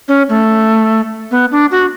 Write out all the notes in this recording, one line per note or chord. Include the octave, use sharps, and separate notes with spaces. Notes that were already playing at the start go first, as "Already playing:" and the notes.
C#4
A3
B3
D4
F#4